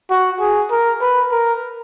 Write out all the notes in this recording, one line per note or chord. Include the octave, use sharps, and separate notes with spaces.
F#4
G#4
A#4
B4
A#4